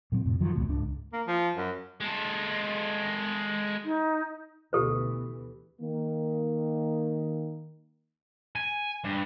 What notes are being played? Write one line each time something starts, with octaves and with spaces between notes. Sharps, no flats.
A#2 F#3 A#3 C4
F2 A2 C3
F#2 D#3 F3 F#3
D1 C#2 G#2 B2
C#2 G#2 D4
A#3
F3
F#2
G#3 A4
D#4
D2 B2 E3 G4 A4 B4
D#3 A#3
G#5
G2